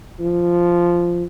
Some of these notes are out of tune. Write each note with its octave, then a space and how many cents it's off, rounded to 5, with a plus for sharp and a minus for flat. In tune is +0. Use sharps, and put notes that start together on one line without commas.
F3 -5